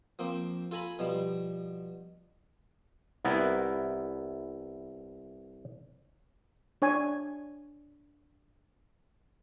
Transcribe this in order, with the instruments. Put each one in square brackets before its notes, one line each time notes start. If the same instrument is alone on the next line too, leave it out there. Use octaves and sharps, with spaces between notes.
[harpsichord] F3 A#3 C4
F4 A4 G#5 A#5 B5
B2 F3 G3
[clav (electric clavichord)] C2 B3 E4 A#4
[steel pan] D4 C#5 G#5